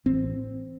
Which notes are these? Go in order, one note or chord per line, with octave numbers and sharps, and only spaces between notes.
A1 C4